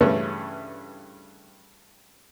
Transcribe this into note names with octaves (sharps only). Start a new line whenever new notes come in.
G2 C#3 E3 A3 C#4